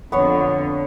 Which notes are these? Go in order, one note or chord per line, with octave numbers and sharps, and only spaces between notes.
F2 D3 B3 C#5